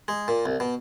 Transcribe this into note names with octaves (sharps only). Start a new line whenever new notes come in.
G#3
A#2
C2
B2